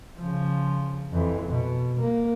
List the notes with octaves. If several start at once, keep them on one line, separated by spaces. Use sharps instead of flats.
C#3 F3
F2 E3
B2
A#3